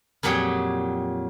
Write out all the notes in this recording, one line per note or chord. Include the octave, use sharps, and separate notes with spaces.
F2 A#2 F#3 G4 G#4